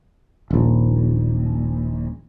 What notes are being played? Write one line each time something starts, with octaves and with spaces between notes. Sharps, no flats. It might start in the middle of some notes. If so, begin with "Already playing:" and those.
D#1 A#1